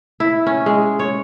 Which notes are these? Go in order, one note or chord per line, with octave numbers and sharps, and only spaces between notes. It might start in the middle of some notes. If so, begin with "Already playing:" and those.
E4
C#4
G#3
C#5